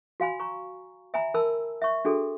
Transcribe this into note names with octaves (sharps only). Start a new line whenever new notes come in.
F#4 F5 G#5 B5
A#5 C#6
E5 G#5 A#5 B5
A#4 A5 B5 E6
E5 C#6
D4 F#4 G#4 A4